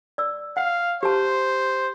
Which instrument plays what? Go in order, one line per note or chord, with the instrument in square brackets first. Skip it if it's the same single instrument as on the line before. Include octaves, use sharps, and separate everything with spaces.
[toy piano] D5 E6
[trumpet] F5 [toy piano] F#5
[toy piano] G4 A5 [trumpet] C5